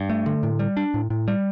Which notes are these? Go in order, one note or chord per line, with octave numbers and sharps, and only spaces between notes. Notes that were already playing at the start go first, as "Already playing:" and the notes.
Already playing: G2
A3
D3
A2
G3
D4
A2
A2
G3